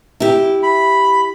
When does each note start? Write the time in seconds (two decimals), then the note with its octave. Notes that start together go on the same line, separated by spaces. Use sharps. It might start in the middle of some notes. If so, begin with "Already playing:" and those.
0.20 E4 G4
0.63 B5